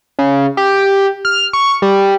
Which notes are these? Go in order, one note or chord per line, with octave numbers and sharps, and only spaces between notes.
C#3
G4
F6
C#6
G3